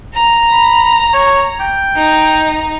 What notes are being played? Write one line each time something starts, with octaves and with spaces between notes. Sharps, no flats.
A#5
B5
C#5
G5
D#4